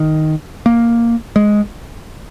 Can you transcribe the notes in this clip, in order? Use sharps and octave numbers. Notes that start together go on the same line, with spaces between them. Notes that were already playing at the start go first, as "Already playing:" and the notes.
Already playing: D#3
A#3
G#3